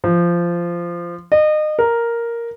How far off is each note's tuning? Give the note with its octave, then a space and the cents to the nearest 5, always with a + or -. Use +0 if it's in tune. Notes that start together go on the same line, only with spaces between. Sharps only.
F3 -15
D#5 -30
A#4 +0